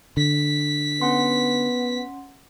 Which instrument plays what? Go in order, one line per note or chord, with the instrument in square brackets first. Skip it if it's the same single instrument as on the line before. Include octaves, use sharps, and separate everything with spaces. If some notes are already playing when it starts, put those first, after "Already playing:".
[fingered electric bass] D3 [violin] B6
[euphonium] B3 [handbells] C#4 F#5 C6